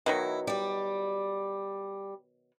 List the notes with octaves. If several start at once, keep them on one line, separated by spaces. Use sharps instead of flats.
B2 D#3 F#3 E4
G3 D5